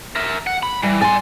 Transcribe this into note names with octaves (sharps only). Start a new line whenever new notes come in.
A#4 E5
F#5
B5
E3 G3
D5 G#5 C6